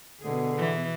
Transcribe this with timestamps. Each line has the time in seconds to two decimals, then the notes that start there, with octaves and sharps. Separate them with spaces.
0.21 B2 D3 G#4
0.58 E3